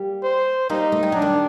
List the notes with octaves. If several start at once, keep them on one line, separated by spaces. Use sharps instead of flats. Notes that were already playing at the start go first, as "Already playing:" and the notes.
Already playing: G3 A#3
C5
G3 A#3 D#4
A3
G3
F#3 D4
D#3 G3